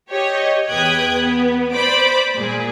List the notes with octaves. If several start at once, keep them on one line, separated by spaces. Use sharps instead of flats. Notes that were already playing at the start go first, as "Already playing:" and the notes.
G4 C#5 D#5
E2 B4 G5 D#6 F#6 G#6
B3
C5 D5 B5 D6
A#2 G#4